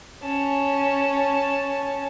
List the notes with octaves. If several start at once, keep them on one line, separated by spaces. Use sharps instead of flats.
C#4 A5